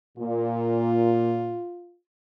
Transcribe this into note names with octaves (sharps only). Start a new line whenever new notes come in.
A#2 F4